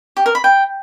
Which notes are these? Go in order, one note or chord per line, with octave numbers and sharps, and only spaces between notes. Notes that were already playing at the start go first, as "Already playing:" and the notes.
G4
A#4
B5
G5